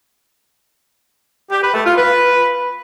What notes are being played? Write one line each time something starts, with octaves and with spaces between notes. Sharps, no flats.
G4
B4
A3
F4
B4